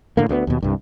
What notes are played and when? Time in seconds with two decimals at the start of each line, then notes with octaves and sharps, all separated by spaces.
0.17 A2 D3 A#3
0.29 D2 G#3 B3
0.47 D#2 B2
0.63 C2 G2